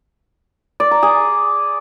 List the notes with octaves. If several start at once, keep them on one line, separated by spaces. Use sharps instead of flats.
D5
A#5
G#4